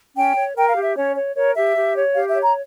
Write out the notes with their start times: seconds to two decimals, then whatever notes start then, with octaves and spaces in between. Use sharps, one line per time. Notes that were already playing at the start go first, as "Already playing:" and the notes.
0.16 C#4 G5
0.36 C#5
0.56 A#4 G5
0.69 F5
0.76 G4
0.83 E5
0.96 C#4 C#5
1.16 C#5
1.35 A#4 C#5
1.55 G4 E5
1.76 G4
1.95 C#5
2.15 G4 F5
2.29 E5
2.36 C#5
2.42 A#5